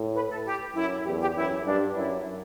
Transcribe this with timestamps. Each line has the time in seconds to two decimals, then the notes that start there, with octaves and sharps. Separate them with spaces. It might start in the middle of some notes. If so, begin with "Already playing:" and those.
Already playing: A2
0.15 B4
0.30 A4
0.45 G4
0.75 F#2 E4
1.05 E2 G4
1.21 G4
1.36 F#2 E4
1.65 G2 D4
1.95 F#2 E4